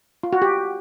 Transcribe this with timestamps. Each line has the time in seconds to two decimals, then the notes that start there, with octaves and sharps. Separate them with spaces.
0.23 F4
0.33 F#4
0.42 G4